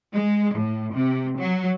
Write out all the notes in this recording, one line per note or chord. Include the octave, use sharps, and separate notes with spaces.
G#3
A2
C3
F#3